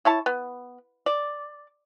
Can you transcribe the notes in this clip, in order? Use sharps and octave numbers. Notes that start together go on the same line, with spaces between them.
E4 C#5 A5
B3
D5